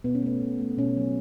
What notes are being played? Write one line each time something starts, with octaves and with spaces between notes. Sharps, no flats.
B2 B3
C#4
A3 B3
B2
A3
B2 C#4
F#3